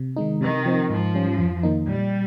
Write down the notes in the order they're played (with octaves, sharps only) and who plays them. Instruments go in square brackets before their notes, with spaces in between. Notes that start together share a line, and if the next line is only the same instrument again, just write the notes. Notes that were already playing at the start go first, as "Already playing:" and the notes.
Already playing: [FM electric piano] C3
D#3 G#3 D#4
[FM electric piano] C3 [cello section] D#3
[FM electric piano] F3 C4
[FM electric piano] G#2 [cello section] F3
[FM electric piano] G3 C#4
F2
D#3 A#3 D#4
[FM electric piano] A#2 [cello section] G3